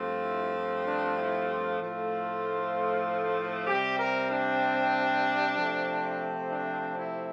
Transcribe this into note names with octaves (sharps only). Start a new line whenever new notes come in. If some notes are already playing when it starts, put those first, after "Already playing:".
Already playing: G2 F3 A3 C4
E4
D4
E4
F4
A2 F3 A3 C4 F4
C3 G3 C4 G4
A#4
D4
C3 F3 A3 C4
D4
E4